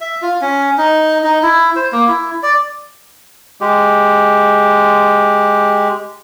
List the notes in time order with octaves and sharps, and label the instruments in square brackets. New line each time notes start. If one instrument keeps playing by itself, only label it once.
[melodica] E5
F4
C#4
D#4
D#4
E4
C5
A#3
E4
D5
[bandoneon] G#3 G4